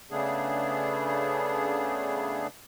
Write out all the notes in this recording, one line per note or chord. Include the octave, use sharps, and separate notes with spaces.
C#3 A3 B3 D4 G#4